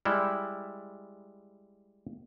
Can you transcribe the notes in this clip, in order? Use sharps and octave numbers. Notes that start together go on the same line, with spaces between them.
G3 G#3 E4